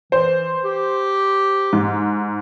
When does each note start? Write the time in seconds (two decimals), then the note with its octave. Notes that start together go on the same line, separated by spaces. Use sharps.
0.12 E3 C5
0.64 G4
1.73 G#2